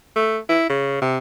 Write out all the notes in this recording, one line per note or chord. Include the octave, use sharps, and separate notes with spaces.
A3
E4
C#3
C3